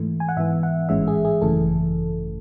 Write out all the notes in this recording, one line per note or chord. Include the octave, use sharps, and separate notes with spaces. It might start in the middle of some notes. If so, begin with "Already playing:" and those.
Already playing: G#2 E3 A3
G#5
F#5
G#2 E3 B3 E5
F#5
A1 G#2 E3 G#3 C#4 E5
G#4
G#4
G#1 F#2 C#3 E3 A3 A4